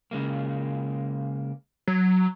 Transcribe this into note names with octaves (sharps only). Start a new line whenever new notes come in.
C#3 G#3 A#3
F#3